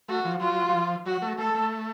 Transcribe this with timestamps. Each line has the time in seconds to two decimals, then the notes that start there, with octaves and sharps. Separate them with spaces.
0.08 A3 F#4
0.25 F3
0.40 F#3 F4
0.68 F#3
0.73 F3
1.06 F#3 F#4
1.22 A3
1.38 A3 A4
1.54 A3